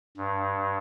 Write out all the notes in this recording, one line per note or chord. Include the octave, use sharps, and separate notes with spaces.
G2